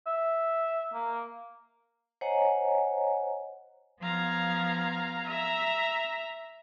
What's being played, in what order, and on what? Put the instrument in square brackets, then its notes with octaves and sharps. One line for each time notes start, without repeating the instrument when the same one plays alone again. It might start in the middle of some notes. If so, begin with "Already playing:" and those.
[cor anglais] E5
A#3
[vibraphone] C5 C#5 D#5 F#5 G#5 A#5
[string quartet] F3 B3 F5 A#5 G#6
E5 A#5